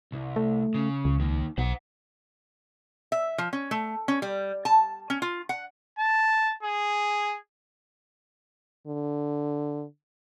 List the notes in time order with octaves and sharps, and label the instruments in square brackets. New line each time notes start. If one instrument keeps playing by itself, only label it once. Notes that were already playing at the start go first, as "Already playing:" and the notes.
[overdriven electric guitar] C2
[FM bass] A3
[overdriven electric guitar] C#3
[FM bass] C#2
[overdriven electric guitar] D#2 D#3
[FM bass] B1 [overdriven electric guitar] C5 F#5
[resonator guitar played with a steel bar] E5
F3
C#4
A3
C#4
G3
A5
C#4
F4
F#5
[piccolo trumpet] A5
G#4
[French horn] D3